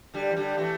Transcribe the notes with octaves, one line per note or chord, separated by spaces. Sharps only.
D3 G3
E3
D3 G3
E3 A3